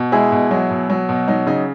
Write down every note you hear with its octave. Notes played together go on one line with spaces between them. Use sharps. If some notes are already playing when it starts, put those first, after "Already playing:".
Already playing: B2
G#3 E4 G#4
B2
F#3
B2
F#3
B2
F#3 D#4
C#3 D#4